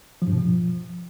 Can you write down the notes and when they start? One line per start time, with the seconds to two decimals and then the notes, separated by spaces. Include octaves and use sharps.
0.22 F3
0.27 G2
0.32 B2
0.38 F3